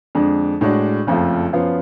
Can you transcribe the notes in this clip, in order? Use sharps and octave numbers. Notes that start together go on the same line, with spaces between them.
F2 D3 G#3 D4
A2 G#3 D4 F#4
F#1 F2 F3 A3 F4
F#2 F3 B3 F4